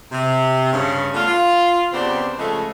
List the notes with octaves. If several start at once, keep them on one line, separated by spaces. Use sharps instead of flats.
C3
G2 C#3 C#4
A3 B3 D4 F4
F4
C#3 B3 C4 D4 G4 C5
C#3 F3 G#3 A3